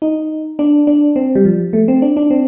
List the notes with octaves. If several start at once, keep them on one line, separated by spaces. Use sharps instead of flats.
D#4
D4
D4
C4
G3
F3
A3
C4
D4
D4
C4